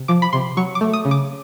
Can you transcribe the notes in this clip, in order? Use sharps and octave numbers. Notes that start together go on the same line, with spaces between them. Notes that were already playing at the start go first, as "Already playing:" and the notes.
Already playing: C3
F3 D6
B5
C3 C6
F#3 C#6
D6
A3
D#6
C#3
D6